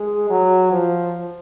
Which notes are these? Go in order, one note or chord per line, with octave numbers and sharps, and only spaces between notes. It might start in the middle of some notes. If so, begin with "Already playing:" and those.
Already playing: G#3
F#3
F3